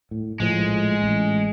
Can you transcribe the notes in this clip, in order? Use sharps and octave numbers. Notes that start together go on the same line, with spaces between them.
A2
A#1 A2 F3 G#3
A1